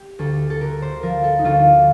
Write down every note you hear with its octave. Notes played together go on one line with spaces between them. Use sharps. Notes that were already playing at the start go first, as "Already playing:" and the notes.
Already playing: G4
D2 A4
A4
D3 A#4
C5
F3 A#4
A4
D#4
D2 F4